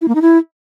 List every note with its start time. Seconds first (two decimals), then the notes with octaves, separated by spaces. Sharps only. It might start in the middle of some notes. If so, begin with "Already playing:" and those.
0.01 E4
0.08 A#3
0.15 D#4
0.22 E4